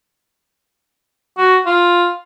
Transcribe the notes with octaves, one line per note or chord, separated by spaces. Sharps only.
F#4
F4